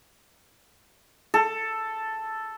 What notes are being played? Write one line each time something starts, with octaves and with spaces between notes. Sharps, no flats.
A4